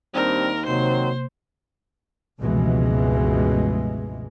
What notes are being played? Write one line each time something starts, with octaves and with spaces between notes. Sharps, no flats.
D#2 G3 C4 D4 A#4
C3 D#3 F#3 A#3 C4 C5
F1 C#2 G2 B2 E3 G#3